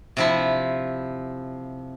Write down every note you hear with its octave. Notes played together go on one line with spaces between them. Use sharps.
C3 F3 E4